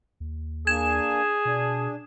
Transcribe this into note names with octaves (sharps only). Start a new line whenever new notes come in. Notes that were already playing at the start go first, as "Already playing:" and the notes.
D#2
A#3 D4 G#4 G#5 G#6 E7
B2 D4